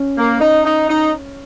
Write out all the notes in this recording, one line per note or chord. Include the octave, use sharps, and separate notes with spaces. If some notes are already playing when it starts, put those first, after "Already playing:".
Already playing: C#4
A#3
D#4
D#4
D#4